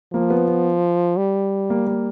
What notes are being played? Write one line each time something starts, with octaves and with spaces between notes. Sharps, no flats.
F3 A#3
B3
B3
G3
A#3
A#3